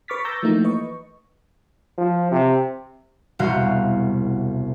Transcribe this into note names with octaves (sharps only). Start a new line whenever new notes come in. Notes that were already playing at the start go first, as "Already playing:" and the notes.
B4 C#6 D6 F6 A6 B6
A#5 E6 G6 A6 A#6
E3 F3 A3 A#3 D#4
B4 D#5 C#6
F3
C3
E1 C2 B2 F#4 F5 G6